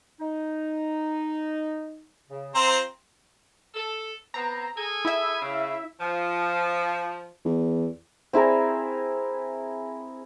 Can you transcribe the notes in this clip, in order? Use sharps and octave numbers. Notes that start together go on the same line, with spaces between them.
D#4
C#3
C4 F4 C5 A#5 C6
A4
B3 C4 A#5
G#4 A4 G#5
E4 E5
C#3
F3
E2
C4 E4 G#4 A#4